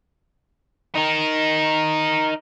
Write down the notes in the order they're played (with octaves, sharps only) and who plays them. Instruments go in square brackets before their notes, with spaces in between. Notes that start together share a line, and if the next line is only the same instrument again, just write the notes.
[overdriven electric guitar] D#4 A#4